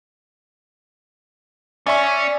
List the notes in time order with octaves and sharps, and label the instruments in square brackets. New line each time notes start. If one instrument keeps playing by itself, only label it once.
[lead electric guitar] C#4 [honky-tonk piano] D5 E5 C#6